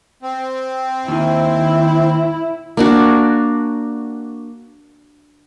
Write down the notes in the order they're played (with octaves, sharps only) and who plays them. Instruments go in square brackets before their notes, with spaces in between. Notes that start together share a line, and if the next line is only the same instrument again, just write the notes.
[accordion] C4
[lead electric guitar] D#2 D#3 [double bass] E4
[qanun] A#3 D4 F#4